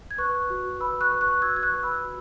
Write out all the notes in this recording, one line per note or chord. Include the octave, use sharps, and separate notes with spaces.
G#6
B4 C#6 F#6
F#4
B4 B5 E6
C#6 F#6
B4
C#6 F#6
F#4 E6 G#6
G#6
C#6 F#6
B4
B5 E6
F#4